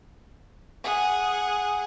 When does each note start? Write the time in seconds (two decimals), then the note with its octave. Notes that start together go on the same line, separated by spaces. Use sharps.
0.84 G#4 F#5